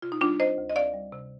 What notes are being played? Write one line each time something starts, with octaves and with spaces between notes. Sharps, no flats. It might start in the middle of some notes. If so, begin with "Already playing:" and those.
C3 F4
D#4
G3 D4 F4
C4 C5 D#5
D2
D#5
C4 D5 F5
G3
C3